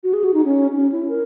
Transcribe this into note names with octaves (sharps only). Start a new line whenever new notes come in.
F#4
G#4
F#4
D#4
C#4
C#4
E4
A#4